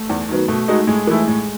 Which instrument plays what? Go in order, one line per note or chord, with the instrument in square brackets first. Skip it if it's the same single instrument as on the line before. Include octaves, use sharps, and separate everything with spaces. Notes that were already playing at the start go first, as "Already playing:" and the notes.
Already playing: [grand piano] A3
[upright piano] E2
D#3 F#3 B3
[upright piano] B2 [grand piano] A3
[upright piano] G#3 D#4 F#4
[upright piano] A2 [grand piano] G#3
[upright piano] E3 A3 E4
A2